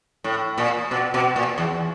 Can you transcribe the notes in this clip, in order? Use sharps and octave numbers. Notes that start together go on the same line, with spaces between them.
A2
A#2
B2
B2
A#2
E2